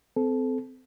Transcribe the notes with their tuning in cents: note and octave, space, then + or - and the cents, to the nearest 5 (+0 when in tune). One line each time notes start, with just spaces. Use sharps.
C4 -25 A4 -20